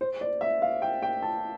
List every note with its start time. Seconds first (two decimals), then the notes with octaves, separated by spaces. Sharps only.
0.01 C5
0.21 D5
0.41 E5
0.62 F5
0.82 G5
1.02 G5
1.22 A5